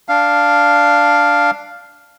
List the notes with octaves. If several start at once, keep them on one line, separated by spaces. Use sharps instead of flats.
D4 F5